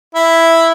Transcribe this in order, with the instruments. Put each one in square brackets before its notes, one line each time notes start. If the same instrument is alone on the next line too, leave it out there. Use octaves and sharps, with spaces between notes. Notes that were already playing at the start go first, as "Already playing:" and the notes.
[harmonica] E4